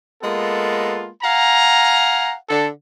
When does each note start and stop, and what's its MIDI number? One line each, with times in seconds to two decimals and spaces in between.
0.22 1.08 56
0.22 1.08 58
0.22 1.08 59
0.22 1.08 65
0.22 1.08 69
1.23 2.34 77
1.23 2.34 78
1.23 2.34 80
1.23 2.34 82
2.49 2.68 50
2.49 2.68 69